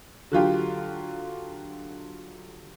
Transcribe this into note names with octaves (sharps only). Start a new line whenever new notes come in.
D3 F#3 F4 G4